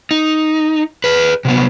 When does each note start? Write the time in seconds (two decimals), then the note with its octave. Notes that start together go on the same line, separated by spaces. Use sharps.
0.11 D#4
1.04 G#4 B4
1.45 C3 F#3 B3